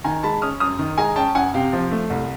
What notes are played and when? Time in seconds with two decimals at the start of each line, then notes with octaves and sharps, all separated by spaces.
0.04 D#3 G#5 A#5
0.23 G#3 A5 B5
0.42 C#4 D#6 F6
0.60 F#2 D#6 F6
0.79 D#3
0.98 G#3 G#5 A#5
1.16 C#4 G5 A5
1.35 F#2 F#5 G#5
1.54 C3 F5 G5
1.73 F3
1.91 A3
2.10 C2